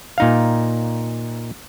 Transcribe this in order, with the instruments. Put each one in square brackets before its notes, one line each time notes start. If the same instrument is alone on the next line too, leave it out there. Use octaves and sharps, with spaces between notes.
[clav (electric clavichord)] A#2 D#4 F5